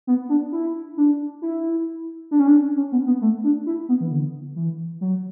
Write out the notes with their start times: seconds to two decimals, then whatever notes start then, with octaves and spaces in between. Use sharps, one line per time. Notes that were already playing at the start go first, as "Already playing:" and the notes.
0.07 B3
0.29 D4
0.52 E4
0.97 D4
1.42 E4
2.31 D4
2.39 C#4
2.47 D4
2.76 C#4
2.92 B3
3.06 B3
3.21 A3
3.44 D4
3.66 E4
3.89 B3
4.00 E3
4.11 D3
4.56 E3
5.01 F#3